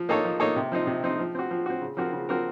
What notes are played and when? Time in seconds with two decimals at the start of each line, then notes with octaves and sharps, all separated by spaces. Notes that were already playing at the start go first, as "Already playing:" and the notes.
Already playing: F3
0.09 A#3 D#4 A4 C#5
0.25 F3
0.40 A#3 D#4 A4 C#5
0.56 C3
0.72 F3 C4 D#4
0.87 C3
1.03 F3 C4 D#4
1.19 F3
1.35 C4 F#4
1.51 F3
1.66 C4 F#4
1.82 C#3
1.97 F3 C4 F#4 A#4
2.13 C#3
2.29 F3 C4 F#4 A#4